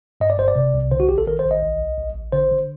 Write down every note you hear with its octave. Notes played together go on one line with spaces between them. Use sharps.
G2 D#5
D5
G1 C5
D5
C3
C2
D3 C5
F#4
A1 G4
A4
D#3 A#4
C5
A1
D#5
C2
C2
A1
A1
D3 C5
D3